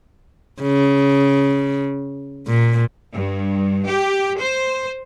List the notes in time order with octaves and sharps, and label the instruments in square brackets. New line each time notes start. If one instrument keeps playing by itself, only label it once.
[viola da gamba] C#3
A#2
[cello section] G2
G4
C5